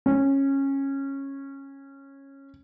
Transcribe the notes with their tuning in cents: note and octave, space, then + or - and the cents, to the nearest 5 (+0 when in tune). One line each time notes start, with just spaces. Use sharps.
C#4 -15